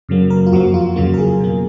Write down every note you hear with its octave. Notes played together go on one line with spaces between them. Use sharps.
F#2 C#3 F#3 A#3
A#4
F4
F2 F3 A#3 F#4
F4
F2 C#3 F#3 A#3 F4
A#4
G#4
B2 A#3